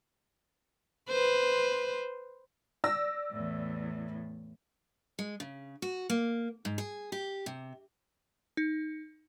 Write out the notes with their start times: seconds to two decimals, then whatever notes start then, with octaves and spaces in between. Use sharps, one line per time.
1.09 B4 C5
2.84 D5 E6 A#6
3.32 E2 A2
5.19 G#3
5.40 C#3
5.82 F#4
6.10 A#3
6.65 G#2
6.78 G#4
7.12 G4
7.46 C3
8.57 D#4